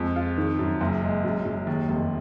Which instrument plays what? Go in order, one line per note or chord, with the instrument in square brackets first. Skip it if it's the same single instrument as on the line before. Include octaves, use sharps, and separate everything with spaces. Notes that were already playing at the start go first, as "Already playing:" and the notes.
Already playing: [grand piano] F2 G#3
F4
D#3
F#2
F#1
G#3
F#2
F#2
D#2
F1